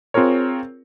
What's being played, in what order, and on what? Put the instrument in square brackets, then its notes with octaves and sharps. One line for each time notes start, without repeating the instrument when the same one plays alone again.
[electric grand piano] C4 F4 G#4 A#4 C#5